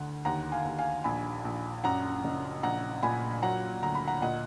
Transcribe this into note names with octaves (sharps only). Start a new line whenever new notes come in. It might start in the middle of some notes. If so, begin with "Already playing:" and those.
Already playing: D2 D3 F#5
D#2 F#5 A#5
F5 G#5
D#2
F5 G#5
A#1 G#5 B5
A#1
F#2 F#5 A#5
F#1
A#1 F#5 A#5
A#2 G#5 B5
F#3 F#5 A#5
D2 A#5
B5
F#5 A#5
A#2 D#5 F#5